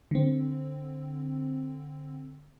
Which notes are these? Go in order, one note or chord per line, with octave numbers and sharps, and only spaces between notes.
D3 C4